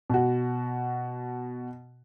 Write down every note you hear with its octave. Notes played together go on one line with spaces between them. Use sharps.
B2 F#4